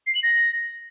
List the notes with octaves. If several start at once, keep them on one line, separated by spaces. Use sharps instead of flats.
C7
F#7
A#6